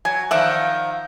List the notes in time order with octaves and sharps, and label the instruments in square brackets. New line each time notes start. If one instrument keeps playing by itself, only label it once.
[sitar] F#3 [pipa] G#5
[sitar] D#3 F3 [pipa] D5 E5 F#5